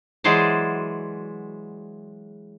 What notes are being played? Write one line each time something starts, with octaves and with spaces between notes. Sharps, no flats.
E3 F#3 G#3 G#4 C5 D5